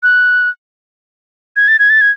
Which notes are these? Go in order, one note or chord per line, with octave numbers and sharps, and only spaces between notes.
F#6
G#6
A6
G#6
A6
G#6